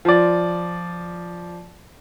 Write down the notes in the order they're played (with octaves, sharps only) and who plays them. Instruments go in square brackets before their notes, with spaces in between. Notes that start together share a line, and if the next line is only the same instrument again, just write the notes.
[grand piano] F3 D5